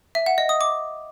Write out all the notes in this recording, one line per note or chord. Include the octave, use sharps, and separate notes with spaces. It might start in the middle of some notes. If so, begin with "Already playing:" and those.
E5
F#5
D#5
D#6
D6